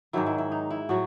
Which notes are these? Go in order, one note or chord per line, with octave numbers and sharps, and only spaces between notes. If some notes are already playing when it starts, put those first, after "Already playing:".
G#2 D#3 F#3 E4
E4
E4
D#4
E4
A2 F#3 F#4